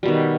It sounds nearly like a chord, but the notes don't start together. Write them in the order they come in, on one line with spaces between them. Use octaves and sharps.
G3 B2 D#3